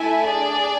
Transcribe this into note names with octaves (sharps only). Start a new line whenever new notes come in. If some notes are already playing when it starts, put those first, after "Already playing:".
Already playing: A3 E4 A4 E5 G#5
D4 G#4 D5